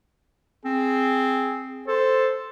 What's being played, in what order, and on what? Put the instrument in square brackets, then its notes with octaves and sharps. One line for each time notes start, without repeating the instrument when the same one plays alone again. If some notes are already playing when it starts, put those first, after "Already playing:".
[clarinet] C4 [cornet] G#4
[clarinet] A4 [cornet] C5